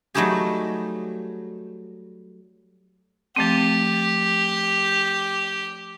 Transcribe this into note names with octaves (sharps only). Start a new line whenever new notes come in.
F#3 G3 A3 D#4 G4 G#4
F3 A3 C4 G4